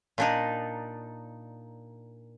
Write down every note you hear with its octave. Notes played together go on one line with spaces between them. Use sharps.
A#2 D4 D#4